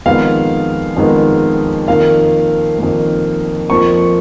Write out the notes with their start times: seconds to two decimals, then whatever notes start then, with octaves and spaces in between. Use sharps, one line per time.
0.06 F2 D#3 G#3 B3 F5
0.97 F2 D#3 G#3 B3
1.88 F2 D#3 A#3 F5
2.78 F2 D#3 A#3
3.70 F2 F3 A#3 C#6